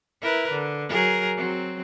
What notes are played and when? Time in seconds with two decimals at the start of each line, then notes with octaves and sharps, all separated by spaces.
0.21 E4 A#4 B4
0.51 D3
0.89 F#3 G#4 A#4
1.37 F#3 C4